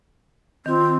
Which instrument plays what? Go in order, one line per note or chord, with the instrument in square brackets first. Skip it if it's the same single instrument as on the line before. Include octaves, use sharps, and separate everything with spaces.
[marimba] D#3 F4 [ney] C4